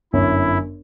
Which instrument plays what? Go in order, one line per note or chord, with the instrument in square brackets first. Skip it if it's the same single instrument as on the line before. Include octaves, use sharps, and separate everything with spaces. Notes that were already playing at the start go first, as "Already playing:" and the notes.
[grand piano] G1 F#2 C#5 [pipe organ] E4